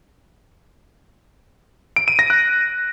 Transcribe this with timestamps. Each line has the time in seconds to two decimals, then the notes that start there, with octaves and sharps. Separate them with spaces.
1.96 D7
2.08 D#7
2.19 A#6
2.30 F#6